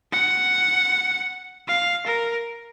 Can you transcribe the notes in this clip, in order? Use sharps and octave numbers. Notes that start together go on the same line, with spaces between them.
F#5
F5
A#4